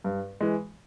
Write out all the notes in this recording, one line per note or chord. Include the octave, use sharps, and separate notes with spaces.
G2
E3 G#3